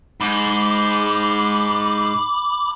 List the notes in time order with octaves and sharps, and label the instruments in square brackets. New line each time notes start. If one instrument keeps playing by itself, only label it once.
[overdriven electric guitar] G#2 [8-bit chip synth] B5 D6